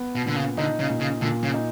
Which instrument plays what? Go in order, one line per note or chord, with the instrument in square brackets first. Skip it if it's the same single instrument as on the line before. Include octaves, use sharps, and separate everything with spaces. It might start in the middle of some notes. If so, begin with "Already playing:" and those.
Already playing: [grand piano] B3
[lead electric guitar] B2
[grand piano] A#2 [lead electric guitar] D3
[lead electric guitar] C#3
[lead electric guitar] D3 [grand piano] D#4
[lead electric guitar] C#3
[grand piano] A#2
[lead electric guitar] C#3
[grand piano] A#2 [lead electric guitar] D3
[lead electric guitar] C#3
[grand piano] D#4